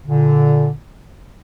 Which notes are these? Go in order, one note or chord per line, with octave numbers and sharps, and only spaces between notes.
A#2 D3